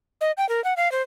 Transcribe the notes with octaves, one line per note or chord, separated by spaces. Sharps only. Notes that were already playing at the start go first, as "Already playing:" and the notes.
D#5
G5
A#4
F#5
F5
C5